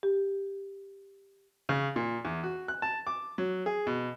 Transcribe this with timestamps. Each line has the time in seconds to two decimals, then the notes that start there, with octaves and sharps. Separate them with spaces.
0.03 G4
1.69 C#3
1.96 A#2
2.25 E2
2.43 F#4
2.68 F#6
2.82 A5
3.07 D6
3.38 F#3
3.66 G#4
3.87 B2